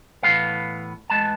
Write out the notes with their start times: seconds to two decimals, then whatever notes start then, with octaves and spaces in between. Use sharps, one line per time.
0.23 G#3 B3 F5
0.27 A2 E3
1.10 A2 E3 G#3 B3 A5